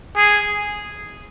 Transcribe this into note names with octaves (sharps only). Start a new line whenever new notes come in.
G#4